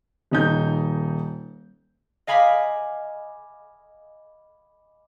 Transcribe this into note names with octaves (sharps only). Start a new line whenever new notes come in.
D#1 D#4 G6
D#5 F5 G#5 B5 D6 B6